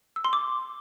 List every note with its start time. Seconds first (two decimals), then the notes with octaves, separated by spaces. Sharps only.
0.16 E6
0.25 C6
0.33 D6